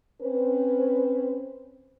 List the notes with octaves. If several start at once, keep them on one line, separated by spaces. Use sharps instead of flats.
C4 C#4 B4 C5